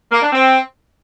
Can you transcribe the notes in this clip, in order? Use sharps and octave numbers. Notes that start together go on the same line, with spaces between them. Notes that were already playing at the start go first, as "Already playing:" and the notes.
A#3
D4
C4